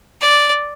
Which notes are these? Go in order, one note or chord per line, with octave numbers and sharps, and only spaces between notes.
D5